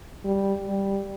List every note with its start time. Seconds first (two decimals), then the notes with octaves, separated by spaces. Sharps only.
0.24 G3
0.69 G3